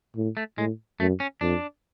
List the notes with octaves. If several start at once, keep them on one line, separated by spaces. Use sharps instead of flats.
A2
A3
A2 G#3
F#2 A3
C#4
F2 D4